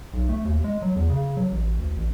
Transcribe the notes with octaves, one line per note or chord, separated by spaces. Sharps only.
B1
A3
D#2
G#3
F#3
E2
C#3
F#3
A1
D2
A1